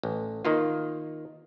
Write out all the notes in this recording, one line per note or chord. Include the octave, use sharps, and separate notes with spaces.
A1
D#3 A#3 F4